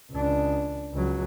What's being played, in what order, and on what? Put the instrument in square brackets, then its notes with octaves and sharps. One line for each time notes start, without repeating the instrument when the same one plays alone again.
[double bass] C#2 D4
C#2 F#3